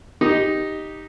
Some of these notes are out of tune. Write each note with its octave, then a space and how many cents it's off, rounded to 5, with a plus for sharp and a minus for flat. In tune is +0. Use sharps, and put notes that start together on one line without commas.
D#4 +0 G4 +0